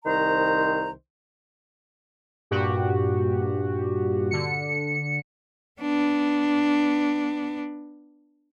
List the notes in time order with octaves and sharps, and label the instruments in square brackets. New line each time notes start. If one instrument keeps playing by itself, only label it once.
[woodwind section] C2 D#3 C5 A#5
[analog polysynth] G2 A#2 F#4 G4
D3 C#7
[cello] B3 D4